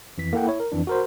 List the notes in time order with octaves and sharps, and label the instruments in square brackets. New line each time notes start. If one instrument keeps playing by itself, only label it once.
[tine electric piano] F2 E3 B6
A#3 E4 A4 F#5 G5
E4 C#5
A#4
F2 E3 D4
F#4 A#4 C5